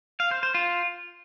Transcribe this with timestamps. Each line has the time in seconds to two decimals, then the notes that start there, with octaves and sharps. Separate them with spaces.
0.20 F5
0.31 C5
0.43 C5
0.54 F4